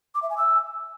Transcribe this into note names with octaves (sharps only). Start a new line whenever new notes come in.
D6
E5
G#5
E6